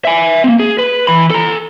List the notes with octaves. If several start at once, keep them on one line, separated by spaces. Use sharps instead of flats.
E5 G#5
A#3 C4
G#4
B4
E3 B5
A4 A#5